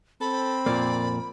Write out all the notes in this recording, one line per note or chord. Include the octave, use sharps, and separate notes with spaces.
C4 A4 B5
F2 A#2 A#3 D5